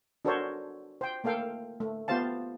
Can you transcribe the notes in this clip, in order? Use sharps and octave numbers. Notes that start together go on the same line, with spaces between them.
D4 F#4 A4 A#4 C5 C#5
C5 G5
A3 A#3 A4 F5 G5
A3
B3 F4 G4 C5 F5 A5